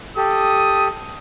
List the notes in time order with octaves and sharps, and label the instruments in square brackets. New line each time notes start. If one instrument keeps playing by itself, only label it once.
[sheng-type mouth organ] G4 A4 [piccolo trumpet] D#6